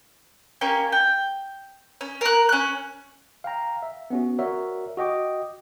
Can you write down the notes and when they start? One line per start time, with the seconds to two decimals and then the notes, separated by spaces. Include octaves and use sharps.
0.61 A#3 C#4 G4
0.92 G5
2.01 C#4
2.21 A#4 F#6
2.49 C#4 F#6
3.44 F5 G5 A#5
3.83 E5
4.10 B3 C#4 F#4
4.39 F#4 A#4 C#5 D5 E5
4.97 F#4 D#5 G5 D6